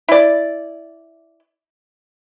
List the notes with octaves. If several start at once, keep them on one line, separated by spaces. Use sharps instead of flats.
E4 D5